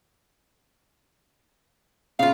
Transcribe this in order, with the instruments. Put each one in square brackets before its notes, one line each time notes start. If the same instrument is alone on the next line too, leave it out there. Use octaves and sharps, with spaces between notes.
[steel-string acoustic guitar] C#3 F4 [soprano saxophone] F5